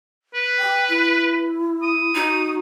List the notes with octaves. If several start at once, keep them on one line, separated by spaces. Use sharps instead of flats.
B4
G5
E4
D#6
D#4 F#4